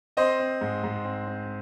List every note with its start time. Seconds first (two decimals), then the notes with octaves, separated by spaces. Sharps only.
0.17 C4 C5 D#5
0.40 C4
0.61 G#2
0.84 G#2
1.05 C4
1.27 C4